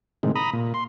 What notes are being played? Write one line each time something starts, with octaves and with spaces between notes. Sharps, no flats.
A2 C3 D#3 G#3
A#5 B5 D#6
A#2
C6